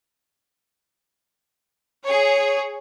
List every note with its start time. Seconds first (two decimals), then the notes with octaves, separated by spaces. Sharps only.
2.05 G#4 C#5